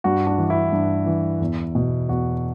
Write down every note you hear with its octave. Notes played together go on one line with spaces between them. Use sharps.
G2 F#4
D4
E3
E4
G2
E3
E2
B2
E2 F#4